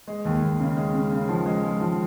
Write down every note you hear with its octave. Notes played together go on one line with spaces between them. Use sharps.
G#3
D#2
D#2
C#3
G#3
C#3
C#3
F3
G#3
G#3
F3